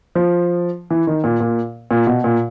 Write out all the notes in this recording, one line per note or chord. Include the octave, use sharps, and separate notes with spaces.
F3
E3
D#3
A#2
A#2
A#2
B2
A#2